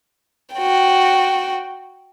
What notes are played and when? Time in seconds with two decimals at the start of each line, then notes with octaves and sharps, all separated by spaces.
0.55 F#4 G5